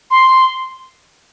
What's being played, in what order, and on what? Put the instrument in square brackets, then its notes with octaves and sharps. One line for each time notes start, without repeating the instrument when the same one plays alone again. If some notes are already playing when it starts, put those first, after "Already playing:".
[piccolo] C6